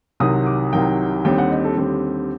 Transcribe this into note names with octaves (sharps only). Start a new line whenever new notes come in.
C2 C3 D#3 F#3 D#6
D6
C2 C3 D#3 F#3 G5
D#2 D3 G3 C4 G5
F#5
D#5
A4
D#2 D3 G3 C4 G4